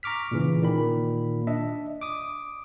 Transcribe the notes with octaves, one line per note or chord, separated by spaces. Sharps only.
A#5 C#6 D6 F6 B6
A#2 C#3 E3
A#2 D#3 B5
D4 D#5 E5
D6 D#6